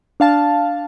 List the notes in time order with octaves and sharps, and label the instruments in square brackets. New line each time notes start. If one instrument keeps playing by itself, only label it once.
[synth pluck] D4 F5 A5